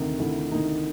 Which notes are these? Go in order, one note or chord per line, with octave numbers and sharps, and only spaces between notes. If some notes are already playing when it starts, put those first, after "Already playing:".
Already playing: D2 C3 D#3 D#4
D2 E4
C3 D#3 D#4